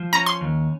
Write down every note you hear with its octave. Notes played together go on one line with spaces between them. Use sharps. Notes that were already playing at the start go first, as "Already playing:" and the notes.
Already playing: F3
C#4 A#5
C6
D#2